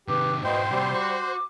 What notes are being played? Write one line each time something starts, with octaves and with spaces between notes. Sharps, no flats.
C3 D#3 G4 B4
G#2 B2 E4 C5 G5
C3 G3 F#4
F#4 D6